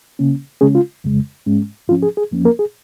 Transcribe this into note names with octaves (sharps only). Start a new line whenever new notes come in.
C#3 A#3 C#4
C#3 G#3 C#4 G#4
F4
F2 C#3 G#3
G#2 G#3 C#4
G#2 F3 C#4 F4
G#4
G#4
F2 F3 A#3 C#4
A#3 A#4
G#4